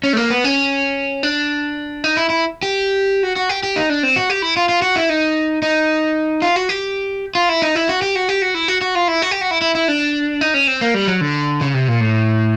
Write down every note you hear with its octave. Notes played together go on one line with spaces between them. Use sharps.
C#4
A3
A#3
B3
C#4
D4
D#4
E4
E4
G4
F#4
F#4
G4
G4
D#4
D4
C4
F#4
G4
E4
F4
F4
F#4
E4
D#4
D#4
F4
F#4
G4
F4
E4
D#4
E4
F#4
G4
F#4
G4
F#4
E4
F#4
F#4
F4
E4
F#4
G4
F#4
E4
E4
E4
D4
D#4
C#4
C4
A#3
G3
F#3
D3
C#3
C3
A#2
A2